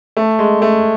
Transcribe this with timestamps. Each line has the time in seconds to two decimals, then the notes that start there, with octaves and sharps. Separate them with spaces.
0.17 A3
0.39 G#3
0.62 A3